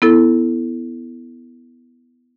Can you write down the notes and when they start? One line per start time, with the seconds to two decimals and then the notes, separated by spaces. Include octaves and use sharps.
0.02 B3 E4 A4